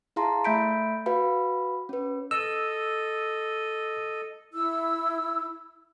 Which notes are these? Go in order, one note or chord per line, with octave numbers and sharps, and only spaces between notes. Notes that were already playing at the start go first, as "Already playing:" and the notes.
E4 G#4 F5 A5 A#5 C6
A3 E5 B5 G6 B6 D7
F#4 B4 F5 B5
C#4 B4
A4 D#5 E6
E4 E6